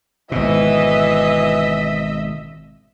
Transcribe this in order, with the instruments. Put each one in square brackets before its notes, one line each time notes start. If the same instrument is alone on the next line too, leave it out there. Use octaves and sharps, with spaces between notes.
[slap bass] G#1 B2 [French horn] E3 [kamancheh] D#5 E5